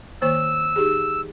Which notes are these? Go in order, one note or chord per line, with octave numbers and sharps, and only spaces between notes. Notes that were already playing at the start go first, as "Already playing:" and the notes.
D#3 A#3 C5 E6
D#4 G4 G#4